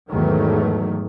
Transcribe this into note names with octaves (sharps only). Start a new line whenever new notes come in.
E2 G#2 D#3 F#3 A3